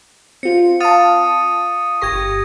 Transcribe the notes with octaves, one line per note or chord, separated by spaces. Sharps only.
C4 F4 C#7
F5 A5 D#6 A6 D#7
G1 G4 C#6 G#6 A#6